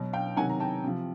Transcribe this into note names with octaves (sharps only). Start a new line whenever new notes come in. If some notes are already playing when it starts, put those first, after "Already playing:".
Already playing: B2 F#3
F5 G5
C3 D#3 F#3 F#5 G#5
A#5
G5 A5
C3 F3